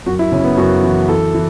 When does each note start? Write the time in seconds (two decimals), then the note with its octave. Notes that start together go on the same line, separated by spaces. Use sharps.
0.06 F#2 F#4
0.19 E4
0.32 C#3 C#4
0.44 B3
0.57 F#2 F#4
0.83 E3
1.09 E3 A4
1.34 E3